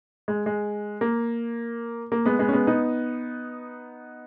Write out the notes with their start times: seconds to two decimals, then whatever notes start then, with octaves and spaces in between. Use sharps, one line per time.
0.28 G#3
0.46 G#3
1.01 A#3
2.12 A#3
2.26 G#3 B3
2.39 G#3 B3
2.48 C#4
2.53 G#3 B3
2.67 B3 D#4